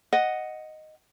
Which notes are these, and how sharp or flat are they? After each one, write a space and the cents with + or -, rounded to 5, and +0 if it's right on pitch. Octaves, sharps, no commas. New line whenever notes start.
D#5 +0 F#5 +0